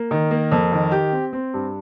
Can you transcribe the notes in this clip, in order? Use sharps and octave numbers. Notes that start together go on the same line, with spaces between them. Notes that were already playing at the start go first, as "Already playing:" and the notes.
Already playing: A#3
D#3
A#3
F2
D#3
G4
C4
C4
G2